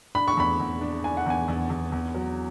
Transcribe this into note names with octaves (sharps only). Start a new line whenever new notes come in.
D4 B5
C#6
E2 B5
E2
D4
D4 G#5
F#5
E2 G#5
E2
E2
E2
F#3